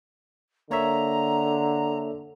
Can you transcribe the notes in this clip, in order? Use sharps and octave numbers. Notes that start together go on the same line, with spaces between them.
D3 A#3 C#5 E5 A#5